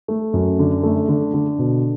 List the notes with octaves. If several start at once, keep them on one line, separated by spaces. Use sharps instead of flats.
A3
F#2
D3
A3
D3
D3
B2